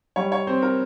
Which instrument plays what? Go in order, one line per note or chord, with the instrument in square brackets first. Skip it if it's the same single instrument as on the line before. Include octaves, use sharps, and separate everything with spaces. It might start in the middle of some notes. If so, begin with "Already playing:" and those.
[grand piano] G3 [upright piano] C#5
[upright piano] C#5
[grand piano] C4 [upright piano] C5
[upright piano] A#4